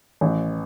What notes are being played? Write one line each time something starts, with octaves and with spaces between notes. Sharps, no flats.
A1